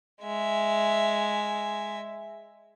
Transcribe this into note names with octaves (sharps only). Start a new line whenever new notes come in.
G#3 E5